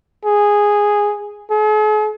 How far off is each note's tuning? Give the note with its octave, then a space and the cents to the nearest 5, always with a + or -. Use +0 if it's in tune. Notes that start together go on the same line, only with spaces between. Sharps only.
G#4 -5
G#4 +45